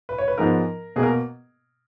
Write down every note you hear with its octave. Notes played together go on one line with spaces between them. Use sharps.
B4
C#5
B4
G#2 F3 B3 A#4
B2 A#3 G#4 A#4